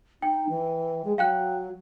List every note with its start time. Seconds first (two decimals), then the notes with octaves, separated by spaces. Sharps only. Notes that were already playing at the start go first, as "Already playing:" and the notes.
0.22 D#4 G5
0.49 E3
1.05 G#3
1.18 F#3 F5 G5 F#6